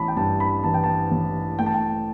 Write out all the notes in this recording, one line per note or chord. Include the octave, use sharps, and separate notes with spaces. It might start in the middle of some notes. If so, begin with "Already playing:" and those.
Already playing: A1 A5 B5
G5
G2 A5
B5
E3 A5
G5
A5
A1
A3 G5
A5
G5